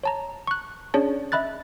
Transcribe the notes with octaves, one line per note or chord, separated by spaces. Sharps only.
C#5 A5 A#5
C#6 F#6
C#4 D4 G#4 C#5 D5 A5
D#5 E5 B5 F#6 A6